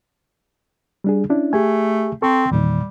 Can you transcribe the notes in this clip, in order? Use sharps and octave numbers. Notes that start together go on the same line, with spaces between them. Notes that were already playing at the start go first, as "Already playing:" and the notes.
G3 D4 G#4
C#4 D4 E4
A3 G4 G#4 G#5
C4 A4 C#6
E2 A#2 D#3 G3